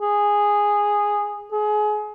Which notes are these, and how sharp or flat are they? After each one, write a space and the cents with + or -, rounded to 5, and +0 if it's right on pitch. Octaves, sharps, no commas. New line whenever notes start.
G#4 -10
G#4 +25